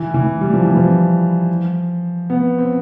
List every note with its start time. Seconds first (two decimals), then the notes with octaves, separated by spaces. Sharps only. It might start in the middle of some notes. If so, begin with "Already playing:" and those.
Already playing: E3
0.14 E3
0.41 G3
0.54 F3
0.65 E3
0.77 F3
2.30 B3
2.59 C4